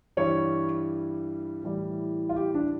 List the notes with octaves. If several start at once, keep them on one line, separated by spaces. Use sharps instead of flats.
G2 E3 G3 C#5
A2 E3 G3
F4
G4
D4